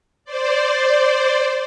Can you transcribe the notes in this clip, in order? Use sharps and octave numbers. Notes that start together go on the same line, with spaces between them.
C5 D5